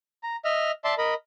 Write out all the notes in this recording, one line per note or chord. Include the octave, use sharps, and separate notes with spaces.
A#5
D#5 E5 F6
D5 E5 A5 C6
A#4 D#5 B5